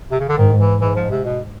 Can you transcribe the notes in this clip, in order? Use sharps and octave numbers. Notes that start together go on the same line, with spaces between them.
C3
C#3
D3
G#2 D#3
E3
G#2 E3
F3
C3
B2